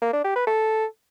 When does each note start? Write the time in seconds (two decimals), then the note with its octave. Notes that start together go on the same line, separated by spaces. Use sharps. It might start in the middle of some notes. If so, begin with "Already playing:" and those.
0.02 A#3
0.13 D4
0.24 G4
0.36 B4
0.47 A4